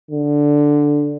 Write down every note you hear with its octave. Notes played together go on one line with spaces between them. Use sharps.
D3